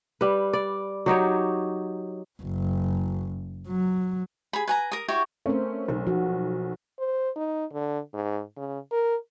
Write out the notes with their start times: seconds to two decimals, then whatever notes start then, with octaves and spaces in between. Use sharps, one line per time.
0.21 G3 B4
0.53 D5
1.06 F#3 D#4 G4 C#5
2.42 F#1
3.68 F#3
4.53 G#4 B5
4.68 B4 G#5 A#5
4.92 A#4 D#6
5.08 E4 F#4 G4 C#5
5.46 A3 C4 C#4 A#4 C5
5.88 B1
6.07 F3 F#4
6.99 C5
7.36 D#4
7.72 D3
8.14 G#2
8.57 C#3
8.92 A#4